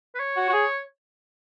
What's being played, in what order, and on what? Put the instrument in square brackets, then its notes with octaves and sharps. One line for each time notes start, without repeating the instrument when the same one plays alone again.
[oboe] B4
C#5
[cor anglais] F#4
F#4
G#4